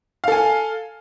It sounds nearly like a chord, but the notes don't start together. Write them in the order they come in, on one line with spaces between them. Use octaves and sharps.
F5 A4 G#5